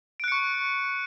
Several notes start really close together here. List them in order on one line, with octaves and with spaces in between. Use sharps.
D7 F#6 C#7 C#6